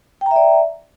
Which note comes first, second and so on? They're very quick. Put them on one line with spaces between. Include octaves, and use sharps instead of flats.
G5 A#5 E5 D5